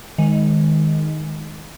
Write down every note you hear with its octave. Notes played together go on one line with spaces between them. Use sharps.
D#3 G#3